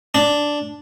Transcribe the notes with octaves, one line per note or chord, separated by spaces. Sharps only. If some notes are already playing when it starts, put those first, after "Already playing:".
D4